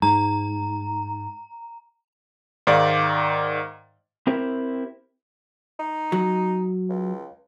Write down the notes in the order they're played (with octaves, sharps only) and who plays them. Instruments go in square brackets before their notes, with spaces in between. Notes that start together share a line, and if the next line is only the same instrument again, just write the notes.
[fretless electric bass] G#2 [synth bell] A#5
[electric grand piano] G#2 D#3 D5 F5 D6
[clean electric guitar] C4 E4 G4 A#4 C5
[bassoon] D#4
[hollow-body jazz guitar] F#3
[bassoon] C#2